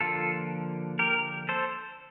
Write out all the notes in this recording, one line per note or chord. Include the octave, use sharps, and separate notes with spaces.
D3 F3 A#3 F4 A4
G4 A#4
A4 C5